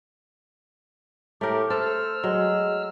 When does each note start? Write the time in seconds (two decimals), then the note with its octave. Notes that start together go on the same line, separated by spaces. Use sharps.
1.41 A2 A3 G4 A#4
1.70 A4 C5 E6 F6
2.24 F#3 G#3